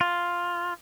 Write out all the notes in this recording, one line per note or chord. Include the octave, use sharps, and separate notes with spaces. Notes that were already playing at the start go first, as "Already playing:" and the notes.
F4